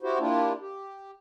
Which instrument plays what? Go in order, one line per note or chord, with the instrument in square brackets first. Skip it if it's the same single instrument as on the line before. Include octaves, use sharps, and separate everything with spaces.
[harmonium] E4 F#4 G4 C5
A#3 D4 E4 F4 G4
G4